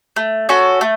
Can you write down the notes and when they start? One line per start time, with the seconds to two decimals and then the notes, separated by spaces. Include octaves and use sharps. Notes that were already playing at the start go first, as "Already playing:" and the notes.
0.16 A3
0.49 C#4 F#4 A4
0.81 A3